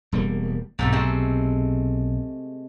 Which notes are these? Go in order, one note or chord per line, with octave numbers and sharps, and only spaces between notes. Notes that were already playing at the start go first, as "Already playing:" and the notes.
E1 G3 A#3
B1 G#2 C3 A3
G#3 A3 C4